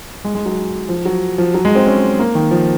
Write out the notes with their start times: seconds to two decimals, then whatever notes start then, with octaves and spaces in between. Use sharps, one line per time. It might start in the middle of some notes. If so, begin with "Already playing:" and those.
0.24 G#3
0.35 G#3
0.46 F#3
0.89 F3
1.05 F#3
1.38 F3
1.54 F#3
1.65 G#3
1.75 C4
1.86 C#4
2.19 A#3
2.35 D#3
2.51 F3